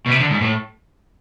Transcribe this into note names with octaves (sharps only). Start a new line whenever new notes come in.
B2
C3
D3
G#2
A2